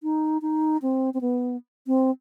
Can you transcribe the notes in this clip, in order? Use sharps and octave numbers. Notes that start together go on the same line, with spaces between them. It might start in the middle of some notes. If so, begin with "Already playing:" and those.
D#4
D#4
C4
C4
B3
C4